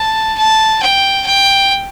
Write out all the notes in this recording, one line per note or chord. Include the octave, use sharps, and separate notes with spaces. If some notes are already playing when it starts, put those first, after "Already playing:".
Already playing: A5
A5
G5
G5